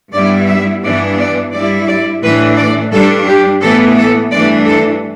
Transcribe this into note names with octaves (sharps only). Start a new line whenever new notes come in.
G2 G3 B3 E4 D5
E5
G2 E3 B3 D4 D5
D5
G2 G3 E4 D5
D5
A2 E3 A3 D4 B4
D5
G2 G3 D4 A4
G4
A2 E3 B3 A4
A4
G2 E3 A3 D4 D5
A4